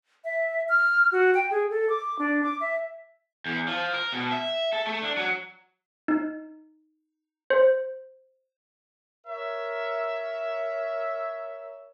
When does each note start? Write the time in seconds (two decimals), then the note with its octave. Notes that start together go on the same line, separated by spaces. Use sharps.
0.24 E5
0.69 F6
1.12 F#4
1.34 G5
1.51 G#4
1.71 A4
1.89 D6
2.19 D4
2.43 D6
2.61 E5
3.46 E2
3.68 F3
3.94 A#4
4.13 B2
4.32 E5
4.73 A4
4.87 A3
5.02 D4
5.17 F#3
6.08 D#4
7.50 C5
9.27 A#4 C#5 E5